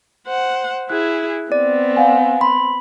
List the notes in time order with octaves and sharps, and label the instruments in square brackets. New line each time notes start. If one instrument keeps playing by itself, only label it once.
[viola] C5 F#5
[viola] E4 G#4 [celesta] F#6
[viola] B3 C4 [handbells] D5
[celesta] F5 F#5 G#5
[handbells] B5 [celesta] C6